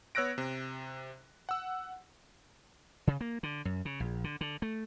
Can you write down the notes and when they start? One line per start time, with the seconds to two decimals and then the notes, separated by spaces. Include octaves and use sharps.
0.15 B3 C#5 E6 F#6 A#6 D7
0.38 C3
1.49 F#5 E6
3.07 C#3
3.21 A#3
3.43 D3
3.65 F#2
3.85 C#3
4.00 A#1
4.24 D3
4.41 D3
4.62 A3